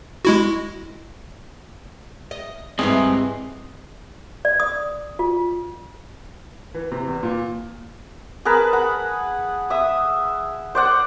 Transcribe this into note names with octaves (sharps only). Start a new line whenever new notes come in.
G#3 E4 F#4
D#5
G#2 E3 G3 C4 G#4 D#5
D5
D#6
F4
E3
C3
E2
A#2
G#4 A#4 B4 A5
F#5 B5
E5 D#6
C5 D5 F#5